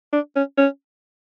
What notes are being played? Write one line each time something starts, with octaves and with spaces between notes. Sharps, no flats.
D4
C#4
C#4